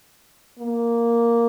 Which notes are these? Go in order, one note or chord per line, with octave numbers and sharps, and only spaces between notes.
A#3